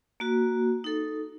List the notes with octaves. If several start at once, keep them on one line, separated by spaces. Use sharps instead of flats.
A#3 F#4
D#4 A4